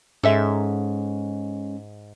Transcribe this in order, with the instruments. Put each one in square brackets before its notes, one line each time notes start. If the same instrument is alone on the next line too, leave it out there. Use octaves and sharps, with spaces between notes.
[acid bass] G#2 [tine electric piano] G#3 C#4 [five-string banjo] A4 E5